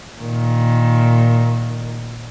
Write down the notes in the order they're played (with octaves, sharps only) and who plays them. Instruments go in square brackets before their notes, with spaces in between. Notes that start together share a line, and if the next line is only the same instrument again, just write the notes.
[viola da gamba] A#2 D#3